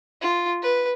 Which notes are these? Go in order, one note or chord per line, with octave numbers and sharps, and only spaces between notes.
F4
B4